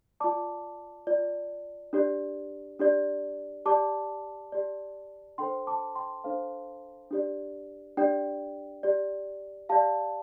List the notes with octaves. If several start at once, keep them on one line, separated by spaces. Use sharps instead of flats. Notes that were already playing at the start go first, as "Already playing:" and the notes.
F4 D5 A5 D6
F4 D5
D4 G4 D5
D4 G4 D5
G4 D5 A5 D6
G4 D5
D4 A4 C5 G5 C6
A5 D6
G5 C6
D4 A4 C5 F5
D4 G4 D5
D4 G4 D5 G5
G4 D5
G4 D5 F5 A5